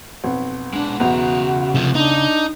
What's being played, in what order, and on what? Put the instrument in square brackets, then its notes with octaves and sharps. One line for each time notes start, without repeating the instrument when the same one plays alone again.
[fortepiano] B1 F2
[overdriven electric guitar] G#3 F#5 [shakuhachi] D4
[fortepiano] B1 E2 [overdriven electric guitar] C#3 A#5 [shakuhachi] F#4
[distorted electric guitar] C3 F3
[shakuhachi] D4 [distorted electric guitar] D#4